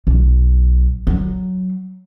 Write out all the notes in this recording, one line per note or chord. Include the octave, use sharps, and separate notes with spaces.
B1
F#3